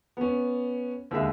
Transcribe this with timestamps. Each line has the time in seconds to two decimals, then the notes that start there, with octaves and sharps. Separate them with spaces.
0.17 B3 C#4
1.11 D#2 D3 G#3 E5